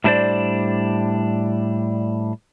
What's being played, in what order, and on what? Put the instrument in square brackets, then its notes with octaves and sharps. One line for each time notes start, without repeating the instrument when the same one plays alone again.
[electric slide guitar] A2 G3 D4 D#4 C5 D5